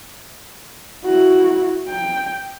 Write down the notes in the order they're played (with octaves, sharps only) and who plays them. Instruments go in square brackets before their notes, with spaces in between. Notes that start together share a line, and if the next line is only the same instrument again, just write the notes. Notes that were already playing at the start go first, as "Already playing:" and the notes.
[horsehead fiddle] E4 F#4
G5